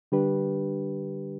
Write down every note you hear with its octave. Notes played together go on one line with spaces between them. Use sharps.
D3 G3 D4 G4 B4